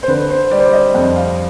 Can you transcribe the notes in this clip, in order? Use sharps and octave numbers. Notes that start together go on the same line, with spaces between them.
C5
D3 B4
C5
G3 D5
C5
D5
D#5
F2 G5
F5